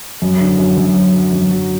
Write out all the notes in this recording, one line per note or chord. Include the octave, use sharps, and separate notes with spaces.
F#2
D3
F#2
F#2
F#3
F#3
F#2
F#3